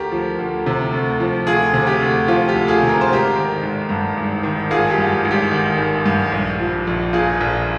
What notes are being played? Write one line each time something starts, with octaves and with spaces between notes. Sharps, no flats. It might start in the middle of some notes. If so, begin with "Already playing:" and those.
Already playing: D2 G4 A#4
F3
D2
C3
D2
F3
D2 F4 G#4
C3
G4
D2
F3 F4
G4
D2
F4 G#4
C3
A#4
C5
G#1 G4 A#4
D#3
G#1
G2
G#1
D#3
G#1 F4 G#4
G4
G2
G#1
G4
D#3
G#1
G2
A#1
F3
A#1
A#2 F4 G#4
A#1